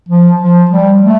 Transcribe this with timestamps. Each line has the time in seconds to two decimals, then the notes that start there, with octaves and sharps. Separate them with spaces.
0.09 F3
0.40 F3
0.71 G3
1.02 A3